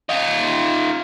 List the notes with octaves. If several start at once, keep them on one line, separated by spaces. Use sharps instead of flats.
D#4 F4